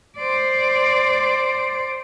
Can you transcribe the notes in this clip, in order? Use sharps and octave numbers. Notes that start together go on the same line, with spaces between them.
C5 D5